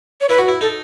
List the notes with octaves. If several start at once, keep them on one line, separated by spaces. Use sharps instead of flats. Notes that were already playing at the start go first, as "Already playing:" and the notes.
C#5
E4 B4
F#4
E4
D#4 A4